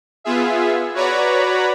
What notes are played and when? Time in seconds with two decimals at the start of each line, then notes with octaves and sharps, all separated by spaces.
0.24 B3 F4 G#4 E5
0.94 F#4 B4 C#5 D5 A#5 B5